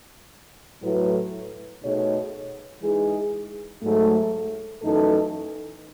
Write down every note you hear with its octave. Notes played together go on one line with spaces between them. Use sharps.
A2 F#3 A3 E4 B4
B2 A3 D#4 G#4 C#5
E3 G#3 D#4 G#4
G#2 F#3 A3
F#2 E3 A3 D#4 A4